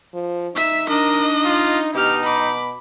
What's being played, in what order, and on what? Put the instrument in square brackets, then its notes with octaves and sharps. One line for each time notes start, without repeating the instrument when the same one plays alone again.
[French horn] F3
[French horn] D#4 [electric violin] E5 B6
[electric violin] D4 D#5 [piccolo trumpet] A#4
[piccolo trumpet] F4
[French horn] B2 [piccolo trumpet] D#4 [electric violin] G4 F6
[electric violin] B5 D6